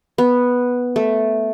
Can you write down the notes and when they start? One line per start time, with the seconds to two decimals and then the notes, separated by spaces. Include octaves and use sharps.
0.18 B3
0.96 A3